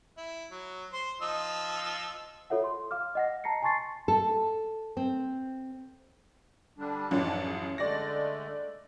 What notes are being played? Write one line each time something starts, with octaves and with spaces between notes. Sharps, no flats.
E4
F#3
C5 C6
F3 D#4 E6
F4 A4 C#5 E5 F#5
C6
F5 D6 F6
D#5 F#5 A#6
A5 A#5 A#6 C7 C#7
G#5 A5 C6 C#6 A6 C7
A4
C4
D3 G3 D4
A1 F#2 D#3 F3 D4
G#4
D3 G#3 A3 D5 A#6